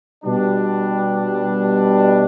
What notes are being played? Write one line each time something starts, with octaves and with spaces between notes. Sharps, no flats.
B2 G3 D4